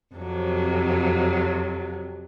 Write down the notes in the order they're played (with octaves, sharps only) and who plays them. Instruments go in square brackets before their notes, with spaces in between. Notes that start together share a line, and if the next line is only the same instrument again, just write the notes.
[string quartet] F2 C3 F#3